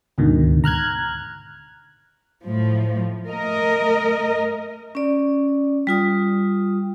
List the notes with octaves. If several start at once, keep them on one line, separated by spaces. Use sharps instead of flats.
D2 G#2 B2 D3 D#3
A#5 F6 F#6 G#6
A2 F3
A3 A#4 D#5
C#4 D5
G3 F4 D#6